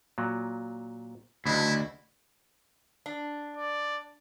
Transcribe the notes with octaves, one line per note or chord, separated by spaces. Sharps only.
A#2 F#3
D2 C#3 F#3 E4 D#5 B5
D4
D5